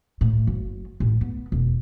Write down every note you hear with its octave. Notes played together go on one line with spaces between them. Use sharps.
A2
F#1
A1
B3
E1